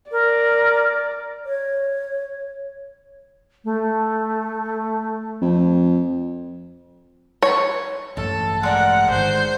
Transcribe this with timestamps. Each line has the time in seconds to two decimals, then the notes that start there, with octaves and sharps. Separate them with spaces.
0.11 A#4 D5
1.45 C#5
3.64 A3
5.42 F2
7.43 C#5
8.17 A1 G2 A4 A5
8.63 G#3 D4 A#4 F#5
9.11 G#2 D#3 C5